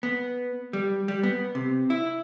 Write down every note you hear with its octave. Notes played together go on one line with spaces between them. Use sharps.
B3
G3
G3
B3
C3
E4